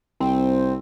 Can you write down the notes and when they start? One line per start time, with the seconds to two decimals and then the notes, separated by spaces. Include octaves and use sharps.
0.20 C2 C4